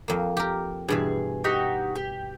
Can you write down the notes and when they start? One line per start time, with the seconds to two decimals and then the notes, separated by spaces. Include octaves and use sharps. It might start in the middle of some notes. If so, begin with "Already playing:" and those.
0.08 F2 A#3
0.37 G4 A#4
0.88 G2 B2 E3 G#4
1.44 D#4 F#4 G4
1.96 G4